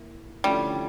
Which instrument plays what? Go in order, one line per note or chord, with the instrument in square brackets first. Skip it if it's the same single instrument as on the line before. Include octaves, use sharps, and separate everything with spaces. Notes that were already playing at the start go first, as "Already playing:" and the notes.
Already playing: [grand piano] A#3 E4
[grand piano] D3 F3 A3 C#4 E4 [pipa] G3